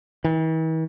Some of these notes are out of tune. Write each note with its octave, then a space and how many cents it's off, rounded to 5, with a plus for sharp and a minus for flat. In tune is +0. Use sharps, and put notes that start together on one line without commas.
E3 -45